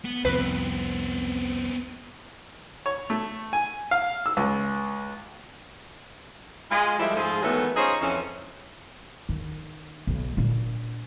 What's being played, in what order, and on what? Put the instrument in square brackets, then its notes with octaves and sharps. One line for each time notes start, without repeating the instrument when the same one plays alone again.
[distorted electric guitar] B3
[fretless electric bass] C2 F2 [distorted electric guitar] B3 C4 [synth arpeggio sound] B4
[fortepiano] C#5
A3
G#5
F5
E6
C#2
[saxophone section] G#3 F4 G#4
F3 G3 G#3 E4 A4 E5
G#2 F3 A3 F4 G#4
D#3 E3 F#3 G#3 A3 B3
C#4 D#4 F4 G#4 C5 C#5
F2 E3 C#4
[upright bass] D#3
B1
A#2 D4